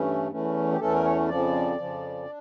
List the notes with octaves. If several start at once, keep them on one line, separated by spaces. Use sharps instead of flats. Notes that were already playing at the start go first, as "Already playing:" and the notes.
Already playing: G2 E3 A3 C#4
E2 E3 A3 C#4
G4
E2 E3 A3 C#4 A4
A#4
C#5
F2 C#3 F3 D5
F2 C#3 F3
D4